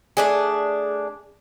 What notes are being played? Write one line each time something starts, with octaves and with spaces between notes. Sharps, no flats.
A3 D4 G#4